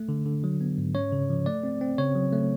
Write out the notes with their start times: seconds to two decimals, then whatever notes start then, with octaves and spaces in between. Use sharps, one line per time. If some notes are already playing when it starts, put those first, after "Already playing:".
Already playing: A3
0.09 D3
0.26 D3
0.44 F#3
0.61 B3
0.78 G#2
0.95 C#4 C#5
1.12 C#3
1.30 F3
1.46 A3 D5
1.64 C4
1.81 C4
1.98 C#3 C#5
2.15 F#3
2.32 A3